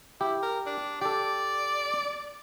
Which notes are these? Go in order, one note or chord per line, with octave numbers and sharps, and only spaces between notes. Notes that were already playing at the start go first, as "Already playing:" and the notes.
E4 G4
A#4
D4
G4 A4 D5